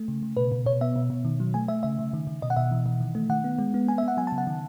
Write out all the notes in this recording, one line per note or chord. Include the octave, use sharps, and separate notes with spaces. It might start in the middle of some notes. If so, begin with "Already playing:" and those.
Already playing: A3
C#3
C#3
B2 B4
B2
B2 C#5
B3 E5
B2
B2
D#3
F#3
A3 G#5
A3 E5
C#3 E5
C#3
D#3
D#3
B2 D#5
F#5
B2 E5
E3
E3
D#3
A3
D#3 F#5
B3
G#3
B3
B3 G#5
E5
B3 F#5
F#3 G#5
A5
C#3
F#5
D#3